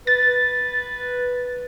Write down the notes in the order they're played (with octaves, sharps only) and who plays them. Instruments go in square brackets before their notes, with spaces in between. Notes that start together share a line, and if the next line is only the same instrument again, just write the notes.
[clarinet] B4 [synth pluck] A6